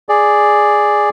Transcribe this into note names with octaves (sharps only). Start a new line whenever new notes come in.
G#4 D5